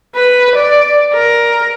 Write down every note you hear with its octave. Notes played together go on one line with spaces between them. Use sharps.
B4
D5
A#4